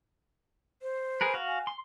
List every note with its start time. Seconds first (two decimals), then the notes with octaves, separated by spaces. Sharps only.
0.82 C5
1.21 G#4 A#4 B4
1.34 F#4 F5
1.48 G#5
1.67 C6